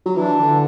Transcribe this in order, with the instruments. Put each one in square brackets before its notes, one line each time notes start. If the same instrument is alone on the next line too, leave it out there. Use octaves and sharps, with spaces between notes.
[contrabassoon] F#3
[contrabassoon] E3 [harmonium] D4
[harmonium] D3 [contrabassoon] E3